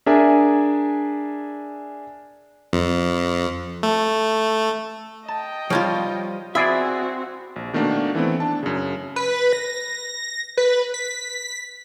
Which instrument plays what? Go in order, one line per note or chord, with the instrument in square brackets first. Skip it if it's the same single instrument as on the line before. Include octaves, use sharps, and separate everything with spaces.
[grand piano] D4 G#4 A#4 E5 G#5
[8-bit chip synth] F2
A3
[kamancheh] D#5 G5 [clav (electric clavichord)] A5
[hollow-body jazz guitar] F3 G3 F4 [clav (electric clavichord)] C#5
[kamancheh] C4 F#4 [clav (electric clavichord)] E4 G#4 D5 [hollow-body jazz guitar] E5
[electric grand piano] A#1
B2 D#3 A3 A#3 D4 F#4
E3 A3 B3 C4
D4 A5
F#2 C#3
[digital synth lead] B4
A#6
B4
B6